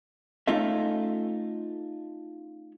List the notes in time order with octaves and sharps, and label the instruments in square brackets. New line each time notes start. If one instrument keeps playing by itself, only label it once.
[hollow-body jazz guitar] A3 C#4 D#4 F4 A4 E5